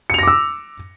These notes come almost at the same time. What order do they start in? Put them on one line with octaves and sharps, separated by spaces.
C#7 F7 A#6 D6 E6